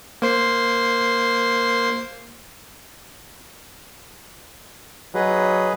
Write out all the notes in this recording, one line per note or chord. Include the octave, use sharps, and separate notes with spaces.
A#3 C5 C7
F#3 G#4 B4 D#5